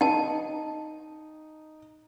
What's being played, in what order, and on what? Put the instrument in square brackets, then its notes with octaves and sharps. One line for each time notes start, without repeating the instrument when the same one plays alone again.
[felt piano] D#4 [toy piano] G5 A5